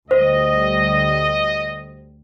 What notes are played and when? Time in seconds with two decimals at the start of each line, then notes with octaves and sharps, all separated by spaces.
0.11 D2 D3 G3 C5 D#5